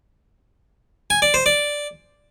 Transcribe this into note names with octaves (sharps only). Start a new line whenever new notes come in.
G#5
D5
C5
D5